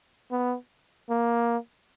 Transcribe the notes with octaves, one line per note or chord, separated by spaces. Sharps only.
B3
A#3